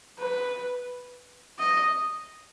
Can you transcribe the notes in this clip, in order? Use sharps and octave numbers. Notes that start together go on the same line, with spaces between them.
B4
D#5